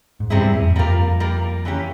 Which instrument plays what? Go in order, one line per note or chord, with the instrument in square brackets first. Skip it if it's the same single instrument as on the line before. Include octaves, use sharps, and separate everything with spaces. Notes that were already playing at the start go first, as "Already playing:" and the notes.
[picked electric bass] G#2
[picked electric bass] G2 [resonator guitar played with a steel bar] C3 G3 C4 E4 G#4
[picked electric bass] G2
F2
E2
[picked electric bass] F2 [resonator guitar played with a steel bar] G3 A#3 F4 A#4
[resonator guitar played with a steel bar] G3 A#3 F4 A#4
E3 A#3 C#4 G4